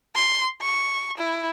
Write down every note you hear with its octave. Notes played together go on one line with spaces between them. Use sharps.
C6
C#6
E4